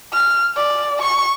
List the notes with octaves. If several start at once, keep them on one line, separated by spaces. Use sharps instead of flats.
F6
D5
C#6